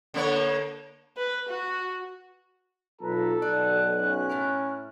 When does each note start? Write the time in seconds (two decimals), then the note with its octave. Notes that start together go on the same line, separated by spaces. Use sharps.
0.14 D3 A#3 C#5
1.17 B4
1.49 F#4
3.01 B1 F4 A4 B4 A#5
3.42 B1 D5 F#6
4.01 C#4
4.29 A2 E4 A#4